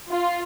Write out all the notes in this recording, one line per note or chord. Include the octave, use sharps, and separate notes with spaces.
F4